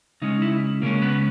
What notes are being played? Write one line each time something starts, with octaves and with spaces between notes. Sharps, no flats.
C#3 G#3 C#4 D#4
E4
C#3 G#3 A#3 C#4 A#4
B3 B4